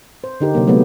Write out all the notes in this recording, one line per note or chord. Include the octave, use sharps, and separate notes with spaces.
C5
D3 D#4 G4 A#4
C3 F#3 A#3
F#3 G#3 A3 B3